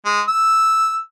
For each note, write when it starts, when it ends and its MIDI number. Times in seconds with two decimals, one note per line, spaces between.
0.05 0.20 56
0.28 0.96 88